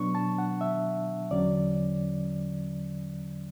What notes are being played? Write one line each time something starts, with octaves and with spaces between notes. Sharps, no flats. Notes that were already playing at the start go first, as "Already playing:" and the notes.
Already playing: B2 F#3 B3 D4 C#6
A5
F#5
E5
E2 D3 F#3 C#4 D5